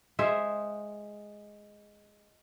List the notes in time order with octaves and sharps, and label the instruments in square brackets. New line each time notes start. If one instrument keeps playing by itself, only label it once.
[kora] G#3 G#4 C5 E5